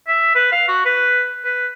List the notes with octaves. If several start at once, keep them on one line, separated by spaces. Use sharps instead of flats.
E5
B4
F5
F#4
B4
B4